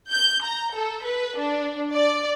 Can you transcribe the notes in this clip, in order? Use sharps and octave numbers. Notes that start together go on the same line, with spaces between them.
G6
A#5
A4
B4
D4
D5